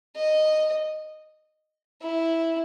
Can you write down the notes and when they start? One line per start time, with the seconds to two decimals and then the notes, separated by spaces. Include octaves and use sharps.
0.16 D#5
2.02 E4